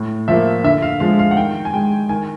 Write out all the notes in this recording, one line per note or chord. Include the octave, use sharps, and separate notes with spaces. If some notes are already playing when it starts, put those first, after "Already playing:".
Already playing: A2
F3 A#3 E5
D3 E5
F5
F3 G#3 F5
F5
F#5
D#3 G5
G#5
G#3 G5
D#3 G#5